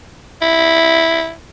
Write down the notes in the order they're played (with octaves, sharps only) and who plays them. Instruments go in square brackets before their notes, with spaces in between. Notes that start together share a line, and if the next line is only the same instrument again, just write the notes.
[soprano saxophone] E4